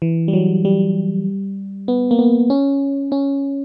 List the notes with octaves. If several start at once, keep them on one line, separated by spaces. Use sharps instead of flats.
E3
G3
F#3
G3
B3
A#3
B3
C#4
C#4